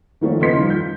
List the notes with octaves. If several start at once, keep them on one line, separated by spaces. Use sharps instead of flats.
D#3 F3 A3 A4 C#5
C#3 B3 B4 D#5 C6 B6
D#3 F3 G3 D#4 F4
G6